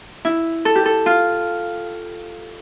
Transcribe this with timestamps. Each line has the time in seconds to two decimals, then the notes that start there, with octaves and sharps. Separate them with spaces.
0.25 E4
0.65 A4
0.75 G4
0.85 A4
1.06 F4